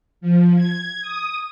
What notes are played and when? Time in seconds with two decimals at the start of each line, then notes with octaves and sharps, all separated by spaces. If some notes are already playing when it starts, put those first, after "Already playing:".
0.21 F3
0.55 G#6
1.01 D#6